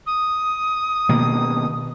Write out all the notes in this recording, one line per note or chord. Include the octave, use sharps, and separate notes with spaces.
D#6
B2 D#3 A#3